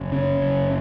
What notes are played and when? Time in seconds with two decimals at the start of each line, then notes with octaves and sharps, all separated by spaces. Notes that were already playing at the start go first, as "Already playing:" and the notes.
Already playing: F#1
0.12 C#3 C#4
0.42 F#1